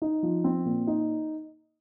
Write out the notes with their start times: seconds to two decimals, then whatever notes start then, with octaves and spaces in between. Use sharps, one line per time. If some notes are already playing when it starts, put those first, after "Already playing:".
0.02 D#4
0.23 F3
0.44 C4
0.66 A#2
0.87 D#4